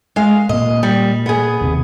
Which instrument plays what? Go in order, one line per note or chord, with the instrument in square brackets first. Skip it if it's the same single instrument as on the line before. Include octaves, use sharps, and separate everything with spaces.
[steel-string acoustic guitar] G#3 F5
[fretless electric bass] A#2 A#3 [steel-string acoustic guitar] D#5
[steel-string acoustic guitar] G3
B3 G#4
[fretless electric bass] D#2 C3